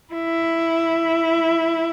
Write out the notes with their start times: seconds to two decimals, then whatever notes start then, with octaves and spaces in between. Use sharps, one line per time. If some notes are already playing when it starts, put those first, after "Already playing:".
0.13 E4